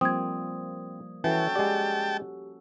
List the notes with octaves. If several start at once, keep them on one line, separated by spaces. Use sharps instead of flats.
F3 G3 A#3 C4 D#6 G#6
E3 C#4 F#4 A4 G5 A5
G#3 G4 D5